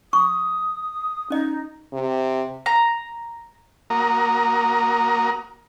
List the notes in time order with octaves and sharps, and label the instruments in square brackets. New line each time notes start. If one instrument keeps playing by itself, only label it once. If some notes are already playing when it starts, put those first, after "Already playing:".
[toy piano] C#6 [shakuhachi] D#6
[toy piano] C#4 D#5 [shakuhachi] D#4
[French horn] C3
[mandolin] A#5
[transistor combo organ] A#3 F#4 A#4 A#5 D#6